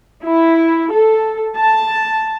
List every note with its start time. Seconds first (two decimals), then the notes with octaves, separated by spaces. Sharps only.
0.24 E4
0.92 A4
1.56 A5